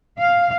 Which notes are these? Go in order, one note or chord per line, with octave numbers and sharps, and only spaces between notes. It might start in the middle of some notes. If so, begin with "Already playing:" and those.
F5